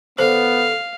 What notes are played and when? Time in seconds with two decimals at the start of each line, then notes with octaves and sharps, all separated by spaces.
0.18 D3 B3 C5 F5